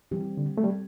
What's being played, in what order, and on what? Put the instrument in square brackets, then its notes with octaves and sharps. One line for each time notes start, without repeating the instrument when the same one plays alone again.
[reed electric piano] E3 [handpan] G3 C4 G4
[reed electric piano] D3
A3
G3